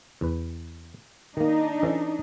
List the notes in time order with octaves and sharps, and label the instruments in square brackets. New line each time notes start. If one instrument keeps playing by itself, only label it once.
[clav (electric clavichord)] E2 B4
[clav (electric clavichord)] D#3 A#3 [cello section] D4 D#4
[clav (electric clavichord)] E3 C#4 A4